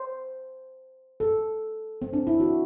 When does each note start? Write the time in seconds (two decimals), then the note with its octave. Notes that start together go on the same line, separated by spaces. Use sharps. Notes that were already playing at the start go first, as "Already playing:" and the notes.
Already playing: C5
1.20 A4
2.02 C4
2.13 D4
2.27 E4
2.40 F#4